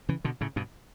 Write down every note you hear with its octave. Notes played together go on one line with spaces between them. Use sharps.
C#3 E3
B2 D3
A2 C#3
G2 B2